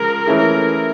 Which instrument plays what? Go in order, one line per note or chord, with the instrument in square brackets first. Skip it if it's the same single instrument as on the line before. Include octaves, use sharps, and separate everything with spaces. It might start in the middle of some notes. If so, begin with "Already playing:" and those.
Already playing: [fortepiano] C#3 F3 G#3 [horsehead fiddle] A#4
[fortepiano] E3 A3 C#4 E4 G#4